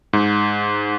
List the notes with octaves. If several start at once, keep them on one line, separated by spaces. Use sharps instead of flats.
G#2